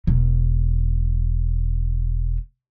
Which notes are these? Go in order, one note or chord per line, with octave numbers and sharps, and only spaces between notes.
E1 B2